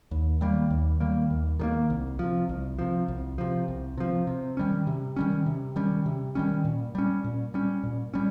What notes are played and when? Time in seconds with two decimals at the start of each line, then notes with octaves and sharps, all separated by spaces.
0.11 D#2
0.41 D#3 G3 A#3
0.70 D#2
1.00 D#3 G3 A#3
1.30 D#2
1.59 D#3 G3 A#3
1.90 C2
2.19 C3 F3
2.49 C2
2.79 C3 F3
3.08 C2
3.38 C3 F3
3.68 C2
3.98 C3 F3
4.27 C3
4.57 D#3 G3 C#4
4.87 C3
5.16 D#3 G3 C#4
5.46 C3
5.76 D#3 G3 C#4
6.06 C3
6.35 D#3 G3 C#4
6.65 A#2
6.95 G3 C#4
7.24 A#2
7.54 G3 C#4
7.83 A#2
8.14 G3 C#4